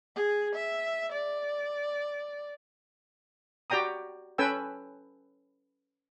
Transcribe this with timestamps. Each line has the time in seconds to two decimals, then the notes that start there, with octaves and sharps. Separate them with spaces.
0.16 G#4
0.55 E5
1.12 D5
3.70 F#4 G4 D5 G5 A#5 D#6
4.38 C#4 A4 B4 G5 G#5 E6